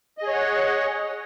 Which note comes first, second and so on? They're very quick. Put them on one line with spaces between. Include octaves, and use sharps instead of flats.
D#5 G#4 C#5 F#5